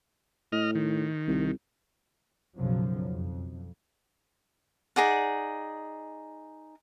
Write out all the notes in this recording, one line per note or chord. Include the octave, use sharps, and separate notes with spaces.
A2 D#5 F6
D#3
C2
B1 F#2 C#3 F3 F#3
F2
D#4 G#4 D5 F#5